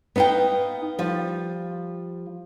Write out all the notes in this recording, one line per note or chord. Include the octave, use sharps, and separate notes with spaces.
B3 D#4 E5 F5 G5
F3 G3